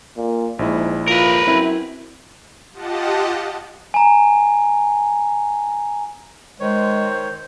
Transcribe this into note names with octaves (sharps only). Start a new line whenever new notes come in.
A#2
A#1 G#2 E4
F4 A#4 B4
F#2 C4 E4
F4 G4 D#5 F#5 A5
G#5 A#5
D#3 G#3 C5 C#5